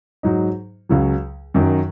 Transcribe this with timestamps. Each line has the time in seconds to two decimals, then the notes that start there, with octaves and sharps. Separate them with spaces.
0.23 G#2 F#3 D#4
0.89 C#2 C#3 F#3
1.54 F#2 D#3 F#3